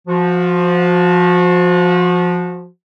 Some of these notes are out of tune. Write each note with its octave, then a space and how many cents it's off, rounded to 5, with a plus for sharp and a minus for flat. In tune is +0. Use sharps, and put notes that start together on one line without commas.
F3 +0 F#4 -30